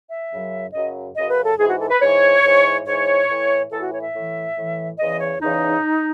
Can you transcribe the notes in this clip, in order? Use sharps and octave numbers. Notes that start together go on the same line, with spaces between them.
E5
F#2 C#3 F#3
F#2 C#3 F#3 D#5
F#2 C#3 F#3 D#5
B4
A4
G#2 E3 G#4
F#4
A4
B4
G#2 E3 C#5
G#2 E3
G#2 E3 C#5
A2 E3
A2 E3 A4
F#4
C#5
E5
A2 E3
A2 E3
E2 C#3 E3 D#5
C#5
E2 C#3 E3 D#4